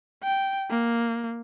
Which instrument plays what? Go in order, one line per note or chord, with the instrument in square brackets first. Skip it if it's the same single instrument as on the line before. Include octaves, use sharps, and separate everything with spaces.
[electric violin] G5
A#3